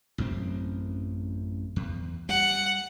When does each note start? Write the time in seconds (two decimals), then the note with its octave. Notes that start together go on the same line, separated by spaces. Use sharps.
0.18 A1 F#2 C4
1.76 E2
2.29 G3 F#5